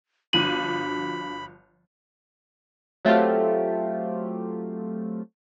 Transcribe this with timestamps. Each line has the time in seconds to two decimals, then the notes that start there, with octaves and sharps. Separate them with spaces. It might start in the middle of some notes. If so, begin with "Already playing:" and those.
0.33 G1 F3 D4 F#4 B5 D#7 F#7
3.05 F#3 A3 C4 F4 G4